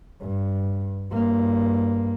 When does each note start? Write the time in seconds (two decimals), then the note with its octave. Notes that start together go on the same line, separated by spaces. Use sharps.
0.21 G2
1.12 G2 A#3